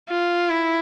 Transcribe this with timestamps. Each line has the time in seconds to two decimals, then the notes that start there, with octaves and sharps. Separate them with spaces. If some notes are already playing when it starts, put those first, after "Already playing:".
0.09 F4
0.50 E4